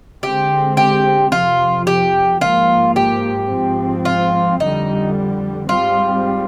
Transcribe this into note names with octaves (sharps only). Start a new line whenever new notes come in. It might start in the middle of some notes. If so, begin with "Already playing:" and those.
D3 G#3 C4 G4
G4
F2 C3 F3 F4
G4
G#2 F3 A#3 F4
G4
G#2 F3 C4
F4
F2 D3 G3 D#4
G#2 G3 C4 F4